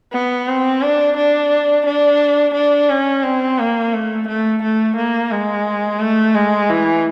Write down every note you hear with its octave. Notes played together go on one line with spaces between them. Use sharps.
B3
C4
D4
D4
D4
D4
C#4
C4
A#3
A3
A3
A3
A#3
G#3
A3
G#3
E3